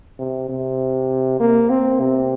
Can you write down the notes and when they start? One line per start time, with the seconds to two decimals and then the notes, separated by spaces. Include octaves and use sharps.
0.19 C3
0.49 C3
1.40 A#3
1.70 C4
2.00 C3